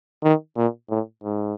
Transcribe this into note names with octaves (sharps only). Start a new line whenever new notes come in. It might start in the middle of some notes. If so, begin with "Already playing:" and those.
D#3
A#2
A2
G#2